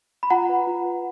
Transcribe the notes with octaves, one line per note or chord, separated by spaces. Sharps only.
B5
F4 F#5 A#5
B4
F4
B4